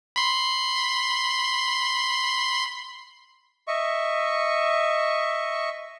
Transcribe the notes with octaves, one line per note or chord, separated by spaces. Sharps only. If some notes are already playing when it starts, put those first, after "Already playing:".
B5 C6
D#5 E5 C#6